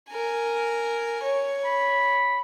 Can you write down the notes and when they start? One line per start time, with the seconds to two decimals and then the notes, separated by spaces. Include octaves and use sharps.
0.11 A#4 G#5
1.23 C#5
1.65 B5